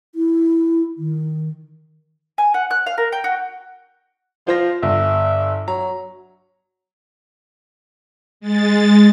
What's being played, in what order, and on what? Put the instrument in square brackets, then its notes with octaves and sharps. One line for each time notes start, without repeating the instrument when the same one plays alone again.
[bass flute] E4
D#3
[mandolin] G#5
F#5
F#6
F5
A#4
G5
F#4
[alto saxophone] F3 [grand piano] F4 C5 A#6
[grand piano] G1 [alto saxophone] E5
[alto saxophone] F#3 [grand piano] A#5
[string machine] G#3 A6